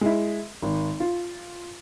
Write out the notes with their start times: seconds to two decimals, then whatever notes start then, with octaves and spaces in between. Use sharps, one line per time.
0.01 G#3 E4
0.62 G#1
1.00 F4